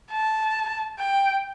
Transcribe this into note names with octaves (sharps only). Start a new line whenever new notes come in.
A5
G5